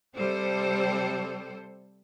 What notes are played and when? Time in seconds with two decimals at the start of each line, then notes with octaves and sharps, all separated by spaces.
0.15 C3 G3 A4 C5